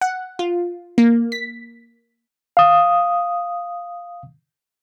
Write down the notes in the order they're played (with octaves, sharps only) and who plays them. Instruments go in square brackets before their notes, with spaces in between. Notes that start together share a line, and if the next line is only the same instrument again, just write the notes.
[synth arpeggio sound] F#5
F4
A#3
B6
[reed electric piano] F5 D#6